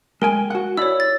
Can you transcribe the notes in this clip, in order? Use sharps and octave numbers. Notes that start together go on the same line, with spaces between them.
G#3 A#4 G5 G#5
F#4 F#5
E4 C#5 D5 E6
A6